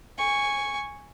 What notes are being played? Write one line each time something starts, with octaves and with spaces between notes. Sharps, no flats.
G#5 C#6